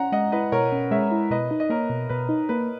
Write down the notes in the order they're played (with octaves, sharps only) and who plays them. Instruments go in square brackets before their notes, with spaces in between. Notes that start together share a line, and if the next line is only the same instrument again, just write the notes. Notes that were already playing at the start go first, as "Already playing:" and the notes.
Already playing: [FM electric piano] C#4 [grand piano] F#5 A#5
[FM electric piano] G#3 [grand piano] D#5 F#5
[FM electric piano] E4 [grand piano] B4 D#5
[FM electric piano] B2 [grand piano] A#4 C#5
[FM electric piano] C#4
[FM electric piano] G#3 [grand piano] C#5 E5
[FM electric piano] E4
[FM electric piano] B2 [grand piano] B4 D#5
[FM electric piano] D#4
[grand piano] D#5
[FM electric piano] A#3 [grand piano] A#4 C#5
[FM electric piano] B2
[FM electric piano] B2 [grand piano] B4
[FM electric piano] D#4
[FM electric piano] A#3 [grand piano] B4